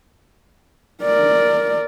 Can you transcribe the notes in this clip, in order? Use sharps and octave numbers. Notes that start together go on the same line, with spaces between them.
A#4 D5